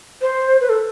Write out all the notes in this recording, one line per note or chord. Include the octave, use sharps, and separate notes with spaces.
C5
B4
A4